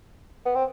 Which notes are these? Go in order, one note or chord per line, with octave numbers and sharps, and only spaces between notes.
B3
C4